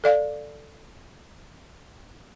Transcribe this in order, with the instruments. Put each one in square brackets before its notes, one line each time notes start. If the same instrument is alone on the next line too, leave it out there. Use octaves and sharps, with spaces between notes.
[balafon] A4 D5 F5